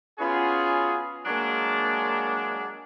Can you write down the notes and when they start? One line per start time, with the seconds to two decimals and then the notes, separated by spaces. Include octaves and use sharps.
0.19 B3 C#4 F4 F#4 G#4
1.26 F#3 G#3 A#3 D4